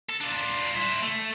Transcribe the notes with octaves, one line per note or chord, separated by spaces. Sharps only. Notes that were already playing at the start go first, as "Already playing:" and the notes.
A4
D4 F4
E4 C5
A3